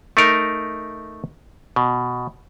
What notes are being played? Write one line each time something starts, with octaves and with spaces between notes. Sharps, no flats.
A3 D#4 A#4
B2